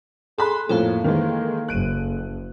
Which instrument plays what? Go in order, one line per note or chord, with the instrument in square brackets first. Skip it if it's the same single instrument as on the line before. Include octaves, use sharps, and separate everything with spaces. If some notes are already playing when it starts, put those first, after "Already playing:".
[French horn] G#4 [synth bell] A4 F#6 [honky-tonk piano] B5 C6
[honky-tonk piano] F2 A2 F3 [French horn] A#3 [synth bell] A4 C5 F5
[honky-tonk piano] D#3 E3 G#3
[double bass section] F#1 [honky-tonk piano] F#6 D7 D#7